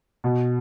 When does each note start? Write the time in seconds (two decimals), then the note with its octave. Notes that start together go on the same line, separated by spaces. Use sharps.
0.24 B2